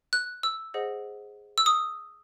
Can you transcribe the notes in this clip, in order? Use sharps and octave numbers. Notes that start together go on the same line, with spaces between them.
F#6
E6
G#4 C5 D#5 F#5
E6
D#6